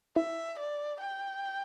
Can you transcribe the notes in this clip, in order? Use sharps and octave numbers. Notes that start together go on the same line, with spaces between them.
E4 E5
D5
G5